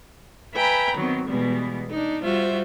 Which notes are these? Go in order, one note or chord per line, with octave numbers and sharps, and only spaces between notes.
B4 E5 G5 G#5 A#5 B5
D#3 F#3 B3 C4
B2 E3 G3 G#3 B3
D4 D#4
G3 F4 F#4 C5 E5